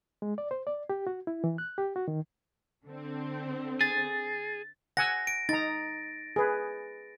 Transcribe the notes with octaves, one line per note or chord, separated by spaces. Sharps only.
G#3
D5
C5
D5
G4
F#4
E4
E3
F#6
G4
F#4
D#3
D3 C4
G#4 A6
F#5 G#5 E6 A#6
D7
D#4 A#5 A6
G#4 B4